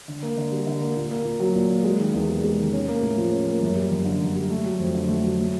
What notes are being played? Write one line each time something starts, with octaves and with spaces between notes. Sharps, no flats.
D3
A#3
D3
G3
D3
A#3
A#2
A#3
A#2
F#3
A#2
A#3
G#3
D#3
E2
C3
G#3
D#3
C#4
A#3
A2
F3
C#4
A#3
F#2
G3
F#2
D3
F#2
G3
A3
F#3
F2
D3
A3
F#3
A3